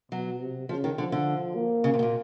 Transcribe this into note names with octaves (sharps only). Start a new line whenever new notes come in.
B2 F#3
C3
C#3 F3
D#3
D3 F3
D3
A#3
C#3
C3
B2
A#2